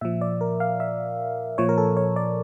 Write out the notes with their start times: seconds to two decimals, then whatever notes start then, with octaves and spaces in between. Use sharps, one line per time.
0.01 A#2 F3 E5
0.21 D5
0.41 A#4
0.60 F5
0.80 E5
1.58 A#2 F3 C#5
1.69 A#4
1.78 A4
1.97 C#5
2.16 D5